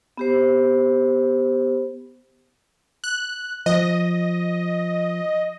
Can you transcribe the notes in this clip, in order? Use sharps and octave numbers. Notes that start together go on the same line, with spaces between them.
B3 G4 C5
F#6
F3 D#5